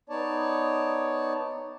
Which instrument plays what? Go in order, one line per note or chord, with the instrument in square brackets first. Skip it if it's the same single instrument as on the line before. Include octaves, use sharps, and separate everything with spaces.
[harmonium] B3 D#4 C#5 D5 A5